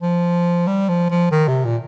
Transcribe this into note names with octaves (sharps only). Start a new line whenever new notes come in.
F3
G3
F3
F3
D#3
C3
A#2